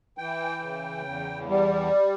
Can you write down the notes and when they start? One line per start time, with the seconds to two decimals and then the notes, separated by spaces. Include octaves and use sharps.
0.18 E3 G5
0.61 C#3
1.05 E2
1.48 G3